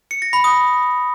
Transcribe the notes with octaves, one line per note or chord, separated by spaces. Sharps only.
C#7
A#6
B5
D#6